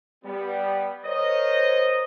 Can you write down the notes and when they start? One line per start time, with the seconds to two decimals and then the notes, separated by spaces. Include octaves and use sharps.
0.24 G3 B3
1.03 A#4 C5 C#5 D#5